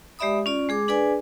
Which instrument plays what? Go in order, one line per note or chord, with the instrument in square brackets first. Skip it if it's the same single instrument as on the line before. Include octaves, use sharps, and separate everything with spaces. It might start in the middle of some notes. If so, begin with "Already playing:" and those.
[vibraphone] G#3 G4 D5 E5 B5 D#6
C#4 F4 D5
G#3 G#4 D6
D4 G#4 B4 D5 G#5